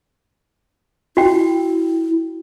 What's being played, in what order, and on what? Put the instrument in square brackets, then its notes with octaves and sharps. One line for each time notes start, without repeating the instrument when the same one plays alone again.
[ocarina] E4 [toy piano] F#4 G5